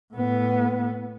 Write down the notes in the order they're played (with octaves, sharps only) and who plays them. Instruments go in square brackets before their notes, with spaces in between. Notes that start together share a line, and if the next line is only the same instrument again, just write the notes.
[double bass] A2 B3